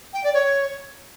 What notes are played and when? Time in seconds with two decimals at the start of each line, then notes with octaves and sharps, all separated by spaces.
0.13 G5
0.24 D5
0.34 C#5